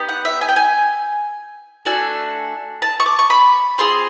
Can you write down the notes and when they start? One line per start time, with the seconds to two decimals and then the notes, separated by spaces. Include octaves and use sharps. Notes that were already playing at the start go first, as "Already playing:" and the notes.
Already playing: B3 D#4 G4
0.09 F#5
0.25 E5
0.41 G#5
0.49 G5
0.56 G#5
1.85 A3 D4 F#4 A4 G#5
2.82 A5
3.00 C#6
3.06 D6
3.19 C#6
3.30 B5
3.78 C4 F4 G#4 C6